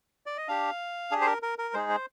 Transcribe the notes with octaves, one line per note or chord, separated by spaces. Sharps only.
D5
D#5
D4 G4 F5
D4 G4 G#4
C5
A#4
A#4
A#4
G#3 D#4 G#4 C5
C5